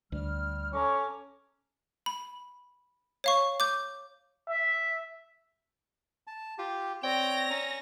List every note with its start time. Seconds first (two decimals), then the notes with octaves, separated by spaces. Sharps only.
0.12 D2 G3 F6
0.74 C#4 A4 C#5 A#5 D6
2.06 B5
3.24 C#5 F5 C#6
3.60 D6 G6
4.49 E5
6.27 A5
6.59 F4 G4
7.03 C4 C#5 D5 G5 A#6 F7
7.50 C#4 A#5